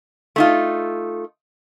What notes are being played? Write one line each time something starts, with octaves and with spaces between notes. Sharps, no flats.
A3 D#4 F4